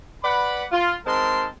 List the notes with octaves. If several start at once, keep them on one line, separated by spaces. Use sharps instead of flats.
B4 D5 F#5 B5
F4
G#3 C4 D#4 A#4 A5 C6